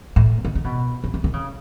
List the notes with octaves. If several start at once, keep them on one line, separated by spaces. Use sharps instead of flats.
A2
D#3
D#3
B2
C#3
D#3
D#3
C#3